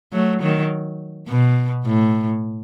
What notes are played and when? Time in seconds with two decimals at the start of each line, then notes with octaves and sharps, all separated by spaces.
0.13 F#3 A3
0.41 D#3 F#3
1.28 B2
1.86 A2